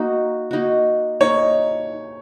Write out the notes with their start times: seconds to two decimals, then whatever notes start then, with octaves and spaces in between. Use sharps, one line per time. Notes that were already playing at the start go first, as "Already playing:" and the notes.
Already playing: A#3 D#4 F#4
0.51 A#3 D#4 F#4
1.20 A#3 D#4 C#5